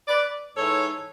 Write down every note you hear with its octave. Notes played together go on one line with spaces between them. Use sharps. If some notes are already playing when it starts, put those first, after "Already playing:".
B4 D5
G#2 E3 A4 C#5